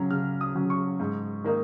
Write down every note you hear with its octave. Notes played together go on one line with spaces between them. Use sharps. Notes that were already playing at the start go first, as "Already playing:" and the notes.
Already playing: C#3 F#3 C#4 A#5
C#3 F6
D#6
F#3 C#4
C#6
G#2
D#3 A#3 D#4